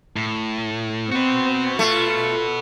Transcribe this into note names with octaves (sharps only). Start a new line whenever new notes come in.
A2
C4 F#4 B4
A3 F4